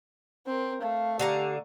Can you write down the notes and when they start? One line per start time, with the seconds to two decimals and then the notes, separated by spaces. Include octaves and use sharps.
0.46 C4 A#4
0.82 A3 F5
1.19 D3 G4 F5 A#5